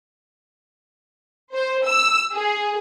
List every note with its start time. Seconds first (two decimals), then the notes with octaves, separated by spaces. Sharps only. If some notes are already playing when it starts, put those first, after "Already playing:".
1.53 C5
1.84 E6
2.33 G#4